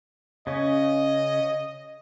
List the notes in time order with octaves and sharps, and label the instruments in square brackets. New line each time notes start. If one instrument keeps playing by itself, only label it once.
[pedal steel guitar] C#3 C#4 [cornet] D#5